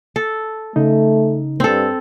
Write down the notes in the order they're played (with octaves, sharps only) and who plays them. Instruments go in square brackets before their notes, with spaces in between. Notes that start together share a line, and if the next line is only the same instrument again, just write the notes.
[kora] A4
[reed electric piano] C#3 D#4 [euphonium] A3
[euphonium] G2 [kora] C4 A4